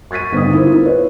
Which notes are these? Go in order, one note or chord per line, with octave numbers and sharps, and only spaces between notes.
C#6 G#6 A6 B6 D#7
G1 C4 D#4 D#6
E4 A#4 C5
F4
B4 C#5